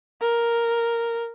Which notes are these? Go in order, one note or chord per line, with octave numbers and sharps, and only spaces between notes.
A#4